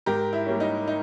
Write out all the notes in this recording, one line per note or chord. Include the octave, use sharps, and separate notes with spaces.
G#2 G4 A#4
E4
G3 A#3 C#4
D#4
D#4